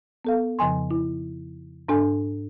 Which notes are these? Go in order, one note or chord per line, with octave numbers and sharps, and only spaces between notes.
B3 A4 F5
F2 C#3 F3 G#5 C6
E4
G#2 D4 A4 G#5